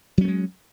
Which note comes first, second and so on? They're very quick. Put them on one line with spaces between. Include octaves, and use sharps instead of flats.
F#3 C#4 A3 G#3